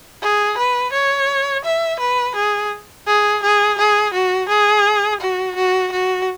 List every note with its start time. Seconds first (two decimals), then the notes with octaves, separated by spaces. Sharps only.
0.22 G#4
0.58 B4
0.92 C#5
1.64 E5
2.00 B4
2.35 G#4
3.07 G#4
3.43 G#4
3.78 G#4
4.13 F#4
4.49 G#4
5.21 F#4
5.56 F#4
5.92 F#4